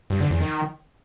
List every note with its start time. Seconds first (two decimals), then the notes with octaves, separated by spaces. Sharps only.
0.10 G2
0.20 D3
0.30 E2
0.40 D#3